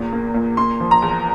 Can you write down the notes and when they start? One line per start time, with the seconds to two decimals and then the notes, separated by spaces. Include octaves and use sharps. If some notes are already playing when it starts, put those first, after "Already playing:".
Already playing: E2 A#2
0.13 A#3
0.34 A#2
0.57 A#3 C6
0.80 F3
0.91 A#5
1.02 E2